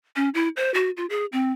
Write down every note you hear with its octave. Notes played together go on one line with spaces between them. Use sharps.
C#4
E4
C5
F#4
F4
G#4
C4